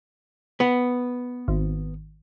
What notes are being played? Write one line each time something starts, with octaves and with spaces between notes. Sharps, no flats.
B3
G#1